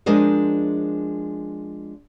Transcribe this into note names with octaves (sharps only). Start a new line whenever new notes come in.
F3 G#3 D4 A#4 C5 D#5